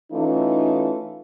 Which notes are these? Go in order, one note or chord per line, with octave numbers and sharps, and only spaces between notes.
E3 A3 C#4 D#4 F4